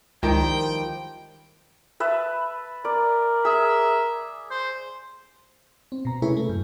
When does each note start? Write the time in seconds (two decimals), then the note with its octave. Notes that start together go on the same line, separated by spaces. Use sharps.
0.23 C#2 D#3 F3 G3 G5
2.00 B4 E5 A5
2.85 A#4 D5
3.45 G#4 E5
4.51 C5
5.92 C4
6.05 B2 A#5
6.22 C3 A3 C#4 E4 G#4 B4
6.37 A3
6.49 F#2